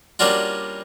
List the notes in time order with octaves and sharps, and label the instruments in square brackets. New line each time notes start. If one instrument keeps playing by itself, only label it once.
[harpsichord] G3 A#3 C#4 D4 F4 F#4